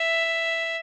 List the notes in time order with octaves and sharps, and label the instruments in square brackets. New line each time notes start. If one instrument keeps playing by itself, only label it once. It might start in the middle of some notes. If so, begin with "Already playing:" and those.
Already playing: [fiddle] E5